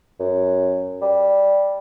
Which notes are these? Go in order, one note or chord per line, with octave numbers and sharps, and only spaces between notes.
F#2
G3